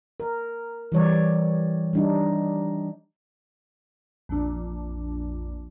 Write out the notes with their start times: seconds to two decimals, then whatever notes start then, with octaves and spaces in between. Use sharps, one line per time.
0.20 A#4
0.92 E3 G3 C#5 D5
1.93 G3 D4 D#4
4.29 A#1 F2 D4